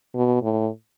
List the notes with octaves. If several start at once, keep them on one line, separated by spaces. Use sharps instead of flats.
B2
A2